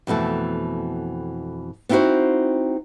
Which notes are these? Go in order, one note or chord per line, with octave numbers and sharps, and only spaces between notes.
F2 B2 E3 A3
B3 C4 D#4 E4 F#4 C5